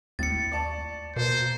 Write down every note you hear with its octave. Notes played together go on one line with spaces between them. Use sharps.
D#2 A2 A6 C#7
D5 A5 C#6
B2 A#3 C5